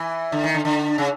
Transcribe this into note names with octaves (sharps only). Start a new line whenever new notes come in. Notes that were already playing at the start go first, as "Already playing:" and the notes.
Already playing: E3
D3
D#3
D3
D3
C#3